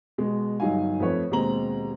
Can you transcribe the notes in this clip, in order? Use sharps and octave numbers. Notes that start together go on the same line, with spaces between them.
B2 G#3
G1 F#3 D#4 F5 G#5
F2 A3 B4 C#5
D#2 B2 G#3 C4 A#5 F#7